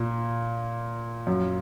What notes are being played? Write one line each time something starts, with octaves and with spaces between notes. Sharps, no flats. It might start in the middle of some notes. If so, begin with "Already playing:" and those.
Already playing: A#2
F#2